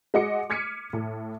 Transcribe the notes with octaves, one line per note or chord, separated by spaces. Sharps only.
G#3 F#4 D#5 D6 C#7
D6 F6 G#6 B6 C#7 D#7
A2